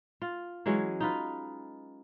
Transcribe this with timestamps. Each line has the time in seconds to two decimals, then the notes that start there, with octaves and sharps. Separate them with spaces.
0.22 F4
0.66 E3 F#3 G#3 C#4
1.00 D#4 F4 B4